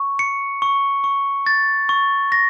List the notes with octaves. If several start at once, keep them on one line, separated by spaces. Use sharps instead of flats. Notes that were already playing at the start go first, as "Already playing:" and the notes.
Already playing: C#6
C#7
C#6
C#6
A6
C#6
A#6